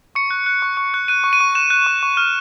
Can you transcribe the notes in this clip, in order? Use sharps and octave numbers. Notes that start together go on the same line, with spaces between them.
C#6 C#7
F#6
F#6
C#6
C#6
F#6
F#6 D#7
C#6
D#7
C#6
F#6 E7
F#6
C#6
C#6
F6